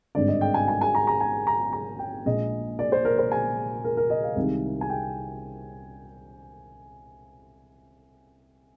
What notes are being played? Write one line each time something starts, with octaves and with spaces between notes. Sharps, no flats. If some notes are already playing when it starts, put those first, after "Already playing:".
G#1 G2 D3 D5
D#5
G5
G#5
G#5
G#5
A#5
A#5
G#5
A#5
A#5
G5
A#1 A#2 G#3 D#5
D5
C5
A#4
C5
G#5
A#4
A#4
D#5
F5
C2 C3 D#3 G#3
G#5
G5